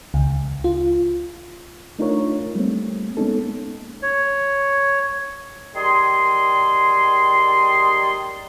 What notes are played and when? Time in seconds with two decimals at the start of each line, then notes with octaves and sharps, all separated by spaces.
0.14 C#2
0.64 F4
1.99 A3 D4 D#4 F4 A#4 C#5
2.55 G3 A3 A#3 C4
3.17 G#3 A#3 B3 C#4 D#4 A4
4.02 C#5
5.75 D#3 G3 G#4 C6